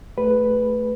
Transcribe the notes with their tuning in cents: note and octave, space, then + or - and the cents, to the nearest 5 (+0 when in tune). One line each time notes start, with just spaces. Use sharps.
A3 +0 G#4 -30 B4 +0